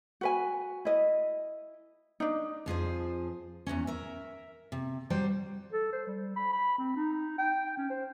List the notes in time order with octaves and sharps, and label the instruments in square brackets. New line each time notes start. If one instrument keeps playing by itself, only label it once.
[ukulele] F#4 B4 G#5
E4 D#5
D4 D#4
[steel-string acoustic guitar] F2 F3 G#4 C5
E2 B2 E3 C#4
A#4 E5
C3
F#3 G3 C5 G5
[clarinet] A4
C5
G3
B5
B5
C4
D#4
G5
C#4
C5